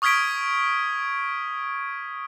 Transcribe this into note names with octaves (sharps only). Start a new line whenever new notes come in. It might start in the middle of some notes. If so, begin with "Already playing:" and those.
C#6 D#6 F6 G#6 B6 D7